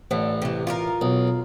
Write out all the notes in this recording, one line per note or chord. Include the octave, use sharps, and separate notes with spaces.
A1 D3
C3 E3
F4 G4 A#4
B1